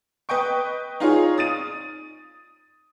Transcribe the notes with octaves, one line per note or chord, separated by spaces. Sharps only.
B4 D#5 G5 C#6
D#4 F4 G#4 C#5
D#6 A6 D#7